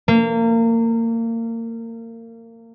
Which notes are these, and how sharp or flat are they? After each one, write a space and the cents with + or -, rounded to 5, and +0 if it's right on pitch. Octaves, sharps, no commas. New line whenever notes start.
A#3 -30